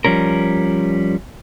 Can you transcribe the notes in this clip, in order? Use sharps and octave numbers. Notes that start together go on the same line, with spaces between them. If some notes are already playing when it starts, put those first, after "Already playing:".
F3 G3 C#4 A#4